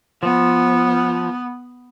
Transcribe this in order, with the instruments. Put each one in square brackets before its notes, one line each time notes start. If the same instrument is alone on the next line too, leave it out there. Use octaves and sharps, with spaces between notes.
[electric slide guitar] F3 [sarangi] B3